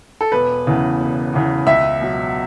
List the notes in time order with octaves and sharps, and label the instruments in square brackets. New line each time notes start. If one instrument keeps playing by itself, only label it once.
[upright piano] A4
E1 B4
E2 C#3 E3
E1
E2 C#3 E3
C#2 E5
B2 F#3